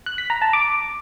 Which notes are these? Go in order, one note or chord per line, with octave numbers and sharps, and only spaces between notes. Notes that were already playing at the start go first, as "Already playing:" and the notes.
F#6
B6
A#5
A5
D6